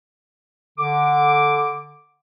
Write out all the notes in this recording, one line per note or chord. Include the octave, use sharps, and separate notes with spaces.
D3 D6